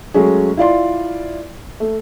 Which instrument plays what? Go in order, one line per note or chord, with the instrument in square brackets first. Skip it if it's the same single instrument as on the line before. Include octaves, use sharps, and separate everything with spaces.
[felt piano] F#3 G#3 A3 C#4 G#4
E4 F4 D5 C6
A3